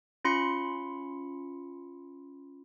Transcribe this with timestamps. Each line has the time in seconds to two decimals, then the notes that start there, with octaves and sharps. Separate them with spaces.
0.25 C#4 F4 B5 C6 C#7